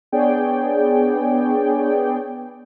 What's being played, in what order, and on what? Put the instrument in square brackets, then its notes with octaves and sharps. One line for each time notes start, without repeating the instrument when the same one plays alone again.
[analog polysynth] B3 D4 G#4 C#5 D5 G5